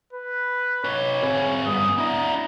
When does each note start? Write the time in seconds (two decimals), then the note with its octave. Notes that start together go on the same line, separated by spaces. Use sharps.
0.13 B4
0.84 D#4 B4 C#5
1.23 C4 G#4
1.67 G2 B3 D#6
1.98 D4 E4 A#5